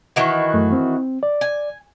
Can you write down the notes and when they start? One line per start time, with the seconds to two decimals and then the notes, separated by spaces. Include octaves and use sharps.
0.16 D#3 E3 F#4
0.54 F#2 A3
0.73 C4
1.23 D5
1.41 G#5